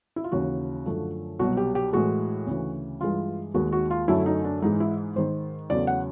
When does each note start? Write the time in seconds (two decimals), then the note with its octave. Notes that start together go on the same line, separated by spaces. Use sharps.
0.16 E4
0.24 F4
0.32 D#2 C#3 E3 F#4
0.86 F#2 D3 F3 A3
1.39 C2 B2 F#3 F#4
1.57 G4
1.75 G4
1.93 A2 E3 G#3 F#4
2.47 D2 C#3 E3
3.01 G2 E3 G#3 F4
3.54 D#2 D#3 G#3 F#4
3.72 F#4
3.91 F4
4.08 F#2 D3 F#3 A3 E4
4.26 D#4
4.44 D4
4.62 G#2 E3 G#3 D#4
4.80 E4
5.16 G#2 D#3 G#3 C5
5.70 E2 C#3 F#3 A3 D5
5.87 F#5